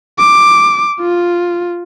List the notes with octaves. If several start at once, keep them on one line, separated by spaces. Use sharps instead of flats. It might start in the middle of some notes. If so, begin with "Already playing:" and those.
D6
F4